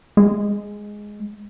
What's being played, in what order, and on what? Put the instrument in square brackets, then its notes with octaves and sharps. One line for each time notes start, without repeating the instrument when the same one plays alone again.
[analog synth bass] G#3